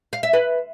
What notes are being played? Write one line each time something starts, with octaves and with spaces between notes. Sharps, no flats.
F5
E5
B4